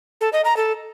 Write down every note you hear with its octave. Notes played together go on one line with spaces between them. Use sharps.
A4
D#5
A#5
A4